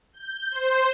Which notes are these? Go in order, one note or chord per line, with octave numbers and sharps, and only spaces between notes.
G6
C5